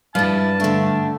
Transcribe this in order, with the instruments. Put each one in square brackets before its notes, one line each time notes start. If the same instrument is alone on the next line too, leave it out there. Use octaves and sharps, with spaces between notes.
[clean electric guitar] G2 B4 F5 [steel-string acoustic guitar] G3 E4 [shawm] A5
[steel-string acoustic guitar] D3 D4 [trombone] A3